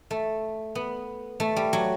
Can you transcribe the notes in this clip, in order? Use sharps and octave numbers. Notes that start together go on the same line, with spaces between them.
A3
B3
A3
G3
F#3